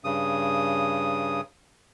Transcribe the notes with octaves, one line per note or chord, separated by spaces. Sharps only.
G2 C#3 D#6